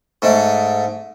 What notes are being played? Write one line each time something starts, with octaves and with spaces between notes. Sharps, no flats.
G#2 A3